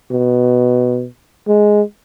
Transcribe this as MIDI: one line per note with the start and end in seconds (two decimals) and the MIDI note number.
0.11 1.06 47
1.48 1.82 56